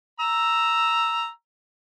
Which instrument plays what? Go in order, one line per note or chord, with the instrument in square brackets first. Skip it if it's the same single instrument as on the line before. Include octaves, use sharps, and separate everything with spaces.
[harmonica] A#5 E6